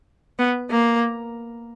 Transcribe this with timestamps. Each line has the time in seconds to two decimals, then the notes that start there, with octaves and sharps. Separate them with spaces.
0.39 B3
0.70 A#3